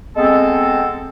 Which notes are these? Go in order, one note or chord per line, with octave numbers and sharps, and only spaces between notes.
G#3 B3 C4 A4